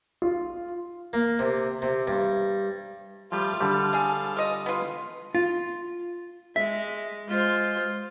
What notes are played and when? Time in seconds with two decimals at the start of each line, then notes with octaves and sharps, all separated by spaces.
0.22 F4
1.13 A#3
1.39 C3
1.82 C3
2.07 G2
3.32 F3 G3 A3 F4
3.61 D3 G3 A4 F5
3.93 D4 G#4
4.37 F4 D#5
4.66 B3 F4
5.35 F4
6.56 G#3 E5
7.28 G#3 F4 C5